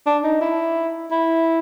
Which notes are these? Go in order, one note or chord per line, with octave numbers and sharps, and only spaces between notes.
D4
D#4
E4
E4